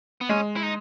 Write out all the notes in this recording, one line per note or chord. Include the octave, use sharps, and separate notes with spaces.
B3
G#3 C#4
E4
D#4